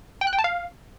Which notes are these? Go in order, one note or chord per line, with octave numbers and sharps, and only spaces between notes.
G5
F#6
G5
A5
F5